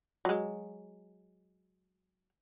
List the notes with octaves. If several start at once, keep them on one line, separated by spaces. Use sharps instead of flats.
F#3 G#3